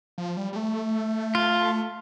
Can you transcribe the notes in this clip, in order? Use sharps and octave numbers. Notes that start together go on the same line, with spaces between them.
F3
G3
G3
A3
F4